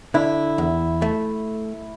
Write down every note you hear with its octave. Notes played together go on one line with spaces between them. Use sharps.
D3 E4
E2
A3